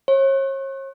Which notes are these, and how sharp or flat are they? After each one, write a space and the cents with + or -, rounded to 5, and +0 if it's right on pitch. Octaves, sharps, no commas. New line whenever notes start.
C#5 -40